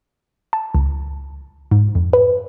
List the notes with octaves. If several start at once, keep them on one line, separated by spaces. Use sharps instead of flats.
A5
C#2
G#2
F2
B4